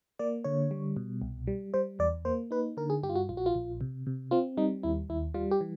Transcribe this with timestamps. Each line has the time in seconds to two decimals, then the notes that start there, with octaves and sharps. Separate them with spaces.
0.19 A#3 D5
0.44 D3 C#5
0.71 G3
0.96 B2
1.22 C2
1.47 G3
1.74 G3 C5
1.99 E2 D5
2.25 A#3 C5
2.51 D#4 B4
2.77 D3 A#4
2.90 G#4
3.03 G2 G4
3.09 F4
3.16 F#4
3.29 A#1 F4
3.37 F#4
3.46 F4
3.55 A#1
3.81 C3
4.07 C3
4.31 C4 F4
4.57 G3 D#4
4.83 D#2 E4
5.09 D#2 E4
5.34 G3 F4
5.51 G4
5.61 E3